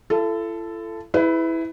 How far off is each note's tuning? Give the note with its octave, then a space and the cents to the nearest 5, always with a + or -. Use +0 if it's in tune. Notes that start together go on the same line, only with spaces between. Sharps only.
E4 +45 A4 +0
E4 -10 G#4 +0 B4 +25